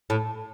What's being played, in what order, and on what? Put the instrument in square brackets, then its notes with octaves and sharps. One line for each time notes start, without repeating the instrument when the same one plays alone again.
[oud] A2